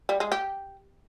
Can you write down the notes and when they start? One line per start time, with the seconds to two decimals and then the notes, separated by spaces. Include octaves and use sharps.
0.09 G3
0.20 G#3
0.32 G4